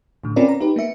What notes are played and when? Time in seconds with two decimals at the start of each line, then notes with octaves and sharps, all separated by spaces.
0.23 A2 D3
0.36 C4 C#4 F4 A#4 B4 D5
0.48 A#5
0.60 D#4 G4 B4
0.76 A#3 B3 E5 C#7